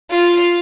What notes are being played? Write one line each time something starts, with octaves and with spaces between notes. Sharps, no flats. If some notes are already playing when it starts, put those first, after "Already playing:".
F4